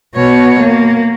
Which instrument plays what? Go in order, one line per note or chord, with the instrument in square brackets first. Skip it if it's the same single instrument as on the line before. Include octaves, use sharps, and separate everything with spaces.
[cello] B2 C#5
A#3